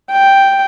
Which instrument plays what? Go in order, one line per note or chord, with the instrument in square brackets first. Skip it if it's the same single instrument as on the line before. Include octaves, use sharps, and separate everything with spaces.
[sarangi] G5